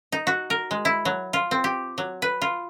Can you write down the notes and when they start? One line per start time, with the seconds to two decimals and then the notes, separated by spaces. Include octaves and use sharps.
0.12 D#4
0.27 F#4
0.50 A#4
0.71 G#3
0.85 E4
1.05 F#3
1.33 F4
1.51 C4
1.64 G4
1.98 F#3
2.22 B4
2.42 F4